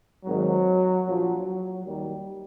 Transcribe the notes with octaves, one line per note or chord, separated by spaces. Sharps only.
G#1 G#2 D#3 F#3
A#1 A#2 F3 F#3
F#3
D#2 D#3 F#3 G3